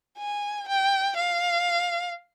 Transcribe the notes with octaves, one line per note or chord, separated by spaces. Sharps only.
G#5
G5
F5